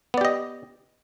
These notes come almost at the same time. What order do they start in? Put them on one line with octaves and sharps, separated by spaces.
B3 D5 G4 D#5